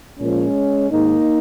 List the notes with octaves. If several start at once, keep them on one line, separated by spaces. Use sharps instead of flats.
A#2 F3 G#3 C#4
G#2 D#3 A#3 D#4